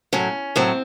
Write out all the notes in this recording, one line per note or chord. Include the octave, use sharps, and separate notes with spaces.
A2 F#3 C#4
A2 F#3 C4